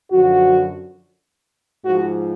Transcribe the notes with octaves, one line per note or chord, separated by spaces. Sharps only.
F#2 D3 F3 F#4
G#2 F3 F#4